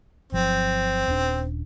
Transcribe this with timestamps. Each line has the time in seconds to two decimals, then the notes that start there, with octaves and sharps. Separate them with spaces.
0.32 G1 F3 F#3 C4
1.08 D#1 C#4 D4